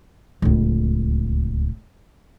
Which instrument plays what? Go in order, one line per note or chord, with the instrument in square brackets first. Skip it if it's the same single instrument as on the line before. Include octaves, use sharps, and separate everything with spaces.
[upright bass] D1 C#2